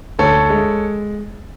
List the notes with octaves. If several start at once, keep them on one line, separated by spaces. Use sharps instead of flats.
D2 A4 C#5
G#3